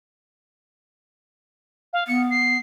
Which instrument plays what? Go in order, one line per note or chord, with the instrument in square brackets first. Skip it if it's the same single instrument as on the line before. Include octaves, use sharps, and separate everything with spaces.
[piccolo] F5
[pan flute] B3 [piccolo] C#7
[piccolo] C7